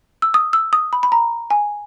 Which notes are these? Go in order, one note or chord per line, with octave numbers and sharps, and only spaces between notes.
E6
D#6
E6
D#6
B5
B5
A#5
G#5